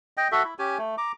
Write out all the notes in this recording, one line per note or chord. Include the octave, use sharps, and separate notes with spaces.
D#5 G5
F#4 A4 E5
E4
C#4 G4 G#5
A3
A#5 D6